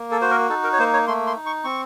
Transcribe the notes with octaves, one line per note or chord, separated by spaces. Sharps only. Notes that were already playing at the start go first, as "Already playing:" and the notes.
Already playing: A#3
A4
F#4 C5
A#4
D#4 A4
A#4
C#5
A#3 C5
C#5
A3 C6
C6
D#4
C#6
C4 C#6